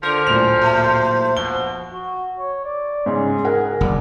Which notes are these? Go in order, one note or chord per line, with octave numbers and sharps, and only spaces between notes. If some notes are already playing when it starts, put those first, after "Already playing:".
D3 F3 A#4
D1 A#2 C5 F7
A3
B2 F3 G7
F#4
C#5
D5
G#2 C#3 G#4
A#4 F#5 G#5
F#1 D4